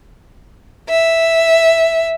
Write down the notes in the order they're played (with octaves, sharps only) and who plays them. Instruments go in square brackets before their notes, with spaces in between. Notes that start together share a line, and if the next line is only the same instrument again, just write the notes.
[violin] E5